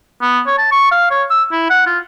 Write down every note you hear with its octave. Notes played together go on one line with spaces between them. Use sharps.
B3
C#5
A5
C#6
F5
C#5
E6
E4
F#5
F4